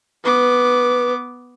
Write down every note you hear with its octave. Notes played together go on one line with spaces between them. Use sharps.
B3 B4 D6